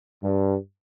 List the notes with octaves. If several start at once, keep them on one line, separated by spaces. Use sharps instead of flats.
G2